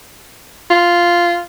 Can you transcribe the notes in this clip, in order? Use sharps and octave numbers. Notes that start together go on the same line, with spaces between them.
F4